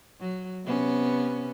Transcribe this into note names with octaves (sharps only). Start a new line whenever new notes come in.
F#3
C3 B3 C#4